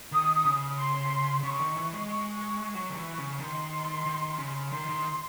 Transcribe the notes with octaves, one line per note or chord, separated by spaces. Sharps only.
D#3 D#6
D#6
C#3
C6
C#3 C#6
D#3
E3
G#3
G#3 C#6
F#3 C#6
D#3
E3
C#3
D#3 C6
D#3
C#3
D#3 C6
D#3